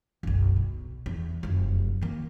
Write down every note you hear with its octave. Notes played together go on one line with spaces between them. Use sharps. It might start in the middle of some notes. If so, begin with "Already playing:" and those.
F#1 B1
B2
E2
F1 F#2
D#3 A#3